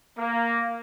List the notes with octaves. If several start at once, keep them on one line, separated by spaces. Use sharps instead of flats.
A#3